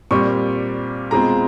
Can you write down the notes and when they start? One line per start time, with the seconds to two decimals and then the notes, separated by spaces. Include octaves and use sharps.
0.11 A#2 G3 C4 C#6
1.11 B2 G#3 C4 F4 A#5